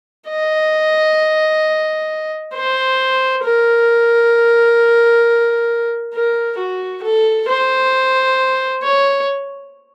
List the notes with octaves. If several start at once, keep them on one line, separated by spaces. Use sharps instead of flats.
D#5
C5
A#4
A#4
F#4
A4
C5
C#5